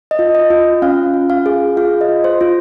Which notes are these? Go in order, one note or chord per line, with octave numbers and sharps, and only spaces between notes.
D#5
F4
D#5
F4
C#4 F5
F4
F5
G#4
F4 F5
D#5
F4
C5
F4